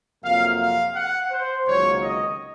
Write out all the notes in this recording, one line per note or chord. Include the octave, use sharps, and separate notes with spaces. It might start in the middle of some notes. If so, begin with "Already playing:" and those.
F2 C3 F#3 A#3 F5
F5
F#5
C5
C#2 C3 D#3 F#3 A#3 C#5
D#5